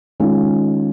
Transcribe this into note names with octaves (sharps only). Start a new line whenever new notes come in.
D#3 G#3 C#4 F4